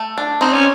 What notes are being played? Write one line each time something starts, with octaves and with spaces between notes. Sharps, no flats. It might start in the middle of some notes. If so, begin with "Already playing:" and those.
Already playing: A3
D4
C4 D#4
C#4